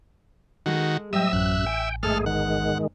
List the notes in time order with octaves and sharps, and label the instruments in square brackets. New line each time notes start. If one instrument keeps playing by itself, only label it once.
[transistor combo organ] D#3 F#4 [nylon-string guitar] G#3 G#4 A4
[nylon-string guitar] A2 F#3 C5 [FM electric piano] G3 G5 [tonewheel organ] D#5 E6 [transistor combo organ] E5
[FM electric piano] A1 [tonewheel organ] F#2 F#6
[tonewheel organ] G5 [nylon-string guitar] G#5
[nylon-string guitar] E2 G#2 [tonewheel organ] G#3 A3 G#4 [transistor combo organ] A4 F6
[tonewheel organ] D#3 G#3 [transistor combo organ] F#5